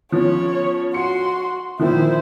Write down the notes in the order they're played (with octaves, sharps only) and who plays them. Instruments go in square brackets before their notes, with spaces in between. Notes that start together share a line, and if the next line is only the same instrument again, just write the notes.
[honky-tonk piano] F3 B3 C#4 [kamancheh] C#5
[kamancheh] F#4 C6 [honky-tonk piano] C#7
[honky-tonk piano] A#2 D#3 F3 [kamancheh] E4 C5